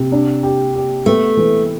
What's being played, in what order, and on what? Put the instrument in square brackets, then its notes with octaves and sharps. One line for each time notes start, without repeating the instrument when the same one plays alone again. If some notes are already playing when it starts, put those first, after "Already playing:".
Already playing: [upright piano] C3
D4
G4
G4
[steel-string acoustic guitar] A3 [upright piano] B3
[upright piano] E3